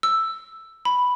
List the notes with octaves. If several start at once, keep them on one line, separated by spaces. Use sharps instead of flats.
E6
B5